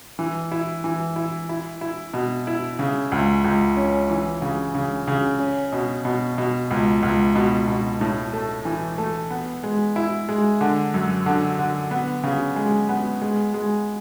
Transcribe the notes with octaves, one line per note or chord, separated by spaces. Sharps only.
E3
E4
E3
E4
E4
E4
B2
E4
C#3
C#2
C#2
C#4
E3
C#3
C#3
C#3
C#4
B2
B2
B2
C#2
C#2
B2
B2
A2
A3
E3
A3
B3
G#3
E4
G#3
D3
F#2
D3
D3
B3
C#3
G#3
B3
G#3
G#3